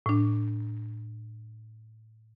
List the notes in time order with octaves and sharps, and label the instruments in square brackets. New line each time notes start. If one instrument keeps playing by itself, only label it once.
[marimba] A2 D4